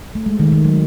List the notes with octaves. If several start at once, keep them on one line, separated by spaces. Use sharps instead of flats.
A3
G#3
D#3
D#3
F#3